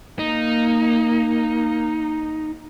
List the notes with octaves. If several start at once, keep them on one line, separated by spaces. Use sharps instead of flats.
A#3 D#4